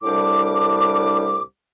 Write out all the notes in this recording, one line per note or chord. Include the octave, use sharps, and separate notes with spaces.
C2 A2 G3 D4 D6